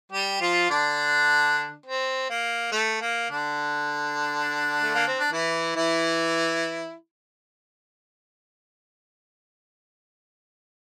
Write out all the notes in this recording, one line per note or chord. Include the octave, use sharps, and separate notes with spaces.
G3 G4
F3 F4
D3 D4
C4
A#3
A3
A#3
D3 D4
A3
A#3
C4
D4
E3 E4
E3 E4